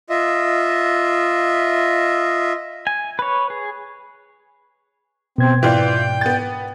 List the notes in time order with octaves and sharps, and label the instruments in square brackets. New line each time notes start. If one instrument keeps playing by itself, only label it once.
[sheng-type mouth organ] F4 D#5 E5
[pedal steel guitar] G#5
B4 C#5
G#4
[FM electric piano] B2 [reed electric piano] B3 G#6 [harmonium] C4
[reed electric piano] G#2 D5 [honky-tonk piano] E3 F4 [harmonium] G5
[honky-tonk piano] B3 A6